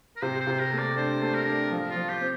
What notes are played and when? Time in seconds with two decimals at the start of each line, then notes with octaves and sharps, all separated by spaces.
0.16 A#4
0.22 C3 C5
0.40 C5
0.47 C3
0.59 A#4
0.72 A3
0.78 D5
0.96 D4 C5
1.22 A3
1.34 A#4
1.46 D4
1.71 F3
1.90 F4
1.96 F3
2.09 G4
2.21 C4